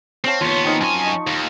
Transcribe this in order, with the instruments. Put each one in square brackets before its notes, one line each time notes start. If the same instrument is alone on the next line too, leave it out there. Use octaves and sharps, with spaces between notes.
[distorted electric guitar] C4 [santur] C#5 F5 A5
[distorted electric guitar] D#2 B3 [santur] F4 C#5
[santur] C4 D#4 A#4
[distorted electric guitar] F#2 G#5 [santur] A5 B5 C#6
[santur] D#5 C#6
[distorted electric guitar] D#2